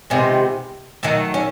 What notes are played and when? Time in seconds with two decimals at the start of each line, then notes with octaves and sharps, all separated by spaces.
0.10 C3 D#3 G#3 B3 F4
1.03 D#3 F#3 A3 D#4
1.34 C#4